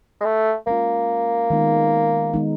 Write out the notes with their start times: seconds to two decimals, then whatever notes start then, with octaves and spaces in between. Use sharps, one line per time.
0.20 G#3
0.25 A3
0.67 G#3 A#3 C#4 F4
1.50 D#3 G#3 B3 D#4
2.34 D#3 G#3 B3 D#4